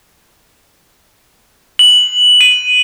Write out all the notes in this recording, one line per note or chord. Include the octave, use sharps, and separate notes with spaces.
F#7
D#7